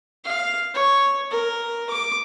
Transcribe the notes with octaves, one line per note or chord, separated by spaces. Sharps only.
F5
C#5
A#4
D6